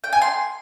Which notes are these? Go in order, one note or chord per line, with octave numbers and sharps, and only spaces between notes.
G5
G#5
C6